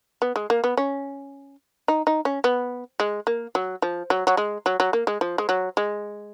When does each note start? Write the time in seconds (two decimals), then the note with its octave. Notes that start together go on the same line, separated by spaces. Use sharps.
0.22 B3
0.36 G#3
0.50 A#3
0.64 B3
0.77 C#4
1.88 D#4
2.07 D#4
2.25 C#4
2.44 B3
3.00 G#3
3.27 A#3
3.55 F#3
3.82 F3
4.10 F#3
4.27 F#3
4.37 G#3
4.66 F#3
4.80 F#3
4.93 A#3
5.07 G#3
5.21 F3
5.38 G#3
5.49 F#3
5.77 G#3